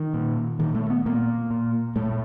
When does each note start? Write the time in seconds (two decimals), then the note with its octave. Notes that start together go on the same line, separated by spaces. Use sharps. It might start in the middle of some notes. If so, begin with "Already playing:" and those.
Already playing: D#3
0.14 A#2
0.59 A#2 D#3
0.75 A3
0.90 B3
1.06 A#2 A#3
1.50 A#2
1.96 A#2 A3